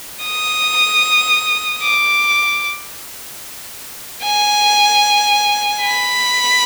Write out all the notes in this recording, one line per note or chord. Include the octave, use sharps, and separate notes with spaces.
D#6
D6
G#5
B5